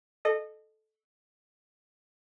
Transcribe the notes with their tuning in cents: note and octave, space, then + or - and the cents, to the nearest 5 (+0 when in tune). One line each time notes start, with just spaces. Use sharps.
A4 -15 D#5 -25